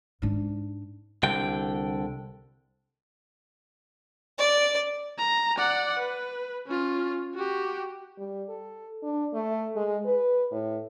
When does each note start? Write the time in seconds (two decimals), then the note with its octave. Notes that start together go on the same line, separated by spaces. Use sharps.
0.22 G#2 D4
1.23 C2 D3 G5
4.38 D5
5.18 A#5
5.57 D5 F#5
5.99 B4
6.67 C#4 F4
7.34 F#4 G4
8.18 G3
8.49 A4
9.03 D4
9.34 A3
9.76 G#3
10.06 B4
10.51 A2